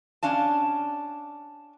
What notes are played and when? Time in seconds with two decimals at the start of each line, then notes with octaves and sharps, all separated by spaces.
0.23 C#4 D4 F5 A5